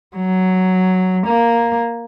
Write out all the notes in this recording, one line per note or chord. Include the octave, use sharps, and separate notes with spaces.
F#3
A#3